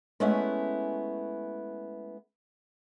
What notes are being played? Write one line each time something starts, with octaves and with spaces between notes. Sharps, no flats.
G#3 A3 B3 C#4 E4